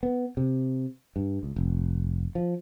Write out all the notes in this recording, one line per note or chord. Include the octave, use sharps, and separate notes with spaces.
B3
C3
G2
C#2
F1
F3